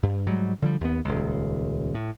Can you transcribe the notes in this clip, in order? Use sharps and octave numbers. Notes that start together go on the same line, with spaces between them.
G2
G#2 F#3 G3
D3 F3 G3
D#2 B3
D#1 C#2
A2